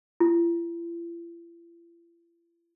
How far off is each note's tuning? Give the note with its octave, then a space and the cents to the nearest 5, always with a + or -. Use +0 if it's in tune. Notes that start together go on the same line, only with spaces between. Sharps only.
E4 +45